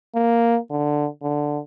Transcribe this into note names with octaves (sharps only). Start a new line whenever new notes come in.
A#3
D3
D3